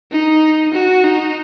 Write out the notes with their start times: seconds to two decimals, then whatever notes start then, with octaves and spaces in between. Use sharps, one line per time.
0.11 D#4
0.73 F#4
1.04 D#4